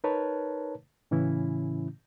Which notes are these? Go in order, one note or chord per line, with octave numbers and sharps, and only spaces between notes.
D#4 A#4 B4 C#5 A5
A2 C#3 E3 C#4 E4